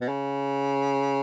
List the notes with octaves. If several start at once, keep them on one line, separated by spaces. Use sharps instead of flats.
B2
C#3